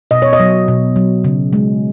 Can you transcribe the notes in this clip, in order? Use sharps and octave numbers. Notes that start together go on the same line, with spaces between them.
B2 D#5
C#5
D#5
F#3
B2
F#3
C#3
G#3